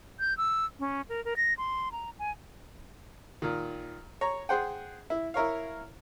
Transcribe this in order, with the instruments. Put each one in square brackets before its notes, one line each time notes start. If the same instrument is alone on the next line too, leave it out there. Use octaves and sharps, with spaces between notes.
[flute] G6
E6
C#4
A#4
A#4
A#6
C6
A#5
G#5
[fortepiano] A#2 D#3
C#5 A#5
G#4 C5 F#5 G5
E4
E4 A#4 C#5 F5